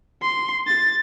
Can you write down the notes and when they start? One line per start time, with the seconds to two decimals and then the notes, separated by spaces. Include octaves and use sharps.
0.22 C6
0.67 A6